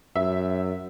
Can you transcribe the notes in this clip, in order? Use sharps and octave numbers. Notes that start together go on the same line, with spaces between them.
F#2 E5